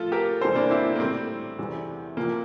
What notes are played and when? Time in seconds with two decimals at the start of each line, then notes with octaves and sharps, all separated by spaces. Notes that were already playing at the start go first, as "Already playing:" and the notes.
Already playing: A2 F3 F4 A4
0.12 G4 A#4
0.41 E2 C3 E3 G3 A4 C5
0.56 A#3 D4
0.71 C4 E4
0.96 A#3
1.00 A2 G3 A3 C4
1.59 E2 C3 E3 G3
2.17 C2 A#2 F3 A#3